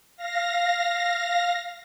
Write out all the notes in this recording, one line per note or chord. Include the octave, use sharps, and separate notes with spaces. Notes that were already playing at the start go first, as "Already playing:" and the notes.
F5 A#6